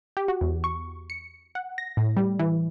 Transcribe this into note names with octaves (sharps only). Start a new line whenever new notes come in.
G4
F#4
E2
C#6
C#7
F#5
A#6
A2
G3
E3